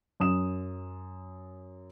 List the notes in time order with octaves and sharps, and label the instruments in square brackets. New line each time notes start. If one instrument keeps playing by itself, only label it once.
[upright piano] F#2 D#6 E7